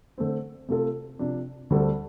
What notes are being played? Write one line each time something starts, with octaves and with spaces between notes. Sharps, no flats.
D3 A3 C4
C3 A3 F4 A4
C3 F3 D4
D2 D3 G3 C4 A4